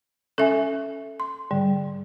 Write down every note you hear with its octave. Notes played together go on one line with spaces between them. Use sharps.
C#4 A4 E5 G#5
C6
G#2 D3 G3